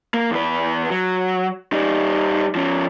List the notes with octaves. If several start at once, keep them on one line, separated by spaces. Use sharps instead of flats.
A#3
E2 B4
F#3
G3 D#4
F3 C#4